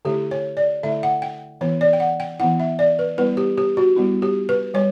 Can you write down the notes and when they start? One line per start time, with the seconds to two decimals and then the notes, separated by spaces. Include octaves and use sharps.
0.05 D3 A3 E4 G4
0.31 C#5
0.57 D5
0.83 D3 A3 E4 E5
1.03 F#5
1.22 G5
1.61 E3 B3 E4 C#5
1.81 D5
1.93 G5
2.00 F#5
2.20 G5
2.39 E3 B3 E4 F#5
2.60 E5
2.79 D5
2.99 B4
3.18 G3 B3 E4 B4
3.37 G4
3.58 G4
3.77 F#4
3.96 G3 B3 E4
4.22 G4
4.49 B4
4.74 G3 C#5